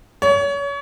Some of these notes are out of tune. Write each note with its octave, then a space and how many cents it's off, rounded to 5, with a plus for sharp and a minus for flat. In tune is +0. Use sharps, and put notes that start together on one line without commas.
C#5 +30